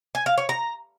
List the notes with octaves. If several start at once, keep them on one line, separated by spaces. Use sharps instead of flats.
G#5
F5
C#5
A#5